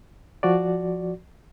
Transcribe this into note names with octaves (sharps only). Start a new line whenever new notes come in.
F3 F#4 D5